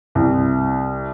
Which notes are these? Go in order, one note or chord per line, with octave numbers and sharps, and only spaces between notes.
C2